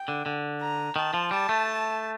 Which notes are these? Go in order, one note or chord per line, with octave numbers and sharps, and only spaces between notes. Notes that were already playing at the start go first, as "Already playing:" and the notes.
Already playing: G5
D3
D3
A#5
D#3 A5
F3
G3 A5
A3